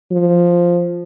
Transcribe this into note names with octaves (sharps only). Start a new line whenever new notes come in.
F3